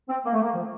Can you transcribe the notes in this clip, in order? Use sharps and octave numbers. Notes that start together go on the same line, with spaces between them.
C4
A#3
A3
A#3
F3